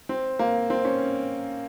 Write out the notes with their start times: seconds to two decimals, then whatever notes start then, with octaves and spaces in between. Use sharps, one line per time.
0.09 C4
0.39 A#3
0.70 C4
0.85 C#4